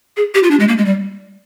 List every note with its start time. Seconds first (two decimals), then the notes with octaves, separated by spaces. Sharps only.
0.17 G#4
0.35 G4
0.43 F4
0.51 D4
0.60 G#3
0.68 A#3
0.78 G#3
0.86 G3